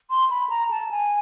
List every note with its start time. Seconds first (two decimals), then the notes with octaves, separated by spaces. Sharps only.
0.10 C6
0.30 B5
0.50 A#5
0.71 A5
0.91 G#5